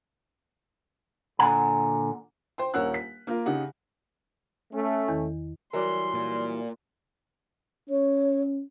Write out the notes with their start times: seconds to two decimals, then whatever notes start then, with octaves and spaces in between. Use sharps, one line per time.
1.39 A#2 D3 F#5 G#5 A#5
2.58 C5 G5 C6
2.74 D#1 C#4 A#4 F#5 E6 F#6
2.94 B6
3.27 A#3 F4 A#4
3.46 C#3 D#4 G4 F#5
4.74 A3 C#4
5.08 E2 D#3
5.73 E3 F#3 G3 A#4 D5 C6
6.14 A#2
7.90 C#4 C#5